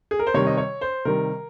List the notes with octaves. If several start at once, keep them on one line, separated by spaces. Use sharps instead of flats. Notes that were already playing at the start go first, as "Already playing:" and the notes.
G#4
A#4
C5
C3 D#3 G3 C#5
D#5
C#5
C5
C3 D#3 G3 A#4